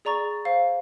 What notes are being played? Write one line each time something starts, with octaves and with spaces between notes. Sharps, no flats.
G#4 D5 A#5 C#6 A6
C5 F5